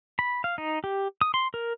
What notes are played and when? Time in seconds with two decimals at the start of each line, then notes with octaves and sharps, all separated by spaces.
0.19 B5
0.44 F5
0.58 D#4
0.84 G4
1.21 D#6
1.34 C6
1.54 A#4